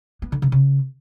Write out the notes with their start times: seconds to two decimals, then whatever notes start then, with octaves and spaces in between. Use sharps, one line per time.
0.22 B3
0.32 D3
0.42 C#3
0.52 C#3